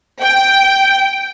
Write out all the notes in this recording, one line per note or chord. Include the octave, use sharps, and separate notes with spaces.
G5